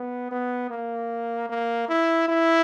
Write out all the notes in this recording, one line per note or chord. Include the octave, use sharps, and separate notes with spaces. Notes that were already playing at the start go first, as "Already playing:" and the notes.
Already playing: B3
B3
A#3
A#3
E4
E4